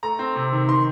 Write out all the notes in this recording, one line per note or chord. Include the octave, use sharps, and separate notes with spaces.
A3 A#5
C4
C3
D#3
D#3 C6